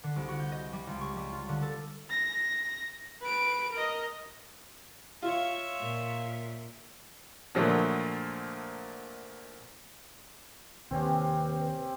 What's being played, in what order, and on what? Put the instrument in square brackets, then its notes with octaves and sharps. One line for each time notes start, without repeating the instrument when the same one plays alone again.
[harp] D3
C2
F#4
G6
D#5
G3
C#2
C#6
G3
F4
D3
A4
[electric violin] A#6
B4 D7
A#4 D#5
[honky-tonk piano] F4 [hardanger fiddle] C#5 E5
[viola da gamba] A#2
[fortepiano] A#2 D3 F3 F#3 A3 A#3
[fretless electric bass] D#2 C3 [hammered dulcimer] C4 C#4 G4 [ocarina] B4